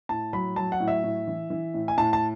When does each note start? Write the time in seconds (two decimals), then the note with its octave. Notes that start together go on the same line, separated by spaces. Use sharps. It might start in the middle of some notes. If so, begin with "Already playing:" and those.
0.09 A2 A5
0.33 F#3 B5
0.56 F#3 A5
0.72 F#5
0.80 A2
0.88 E5
1.04 A2
1.27 E3
1.50 E3
1.74 A2
1.88 G#5
1.97 A2 A5
2.13 A5